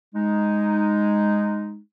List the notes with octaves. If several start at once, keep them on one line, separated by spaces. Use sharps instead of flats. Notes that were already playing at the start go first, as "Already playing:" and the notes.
G#3 D#4